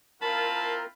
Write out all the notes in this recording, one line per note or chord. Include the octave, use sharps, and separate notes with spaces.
C4 E4 F4 A#4 A5 B5